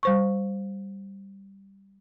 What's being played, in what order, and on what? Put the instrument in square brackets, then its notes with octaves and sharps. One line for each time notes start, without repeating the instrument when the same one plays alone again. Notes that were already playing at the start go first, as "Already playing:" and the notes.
[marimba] G3 C5 C#6